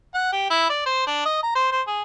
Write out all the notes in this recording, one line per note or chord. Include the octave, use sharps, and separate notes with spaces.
F#5
G4
E4
D5
C5
D4
D#5
A#5
C5
C5
G#4